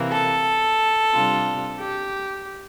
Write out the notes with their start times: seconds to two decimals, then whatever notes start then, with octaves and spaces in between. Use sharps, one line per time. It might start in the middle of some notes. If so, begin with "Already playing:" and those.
Already playing: C3 E3 A#3
0.12 A4
1.13 C3 G3 D4 F4
1.79 G4